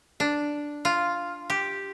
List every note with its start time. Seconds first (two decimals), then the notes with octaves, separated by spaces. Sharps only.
0.20 D4
0.85 F4
1.50 G4